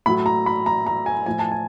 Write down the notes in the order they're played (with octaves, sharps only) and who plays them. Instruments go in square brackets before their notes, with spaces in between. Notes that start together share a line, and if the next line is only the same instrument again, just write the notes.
[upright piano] A2 F#3 B5
A#5
B5
A#5
A#5
G#5
A2 F3 G#5
A5
G#5